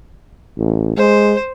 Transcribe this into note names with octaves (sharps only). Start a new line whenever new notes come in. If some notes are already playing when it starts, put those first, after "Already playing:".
A1
G#3 C5